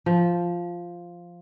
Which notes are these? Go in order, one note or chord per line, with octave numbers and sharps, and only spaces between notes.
F3